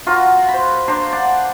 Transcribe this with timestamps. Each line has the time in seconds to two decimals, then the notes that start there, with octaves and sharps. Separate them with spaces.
0.06 F4 F#4 A#4 F#5
0.48 C5 B5
0.88 D4 C5 A#5
1.12 D5 F#5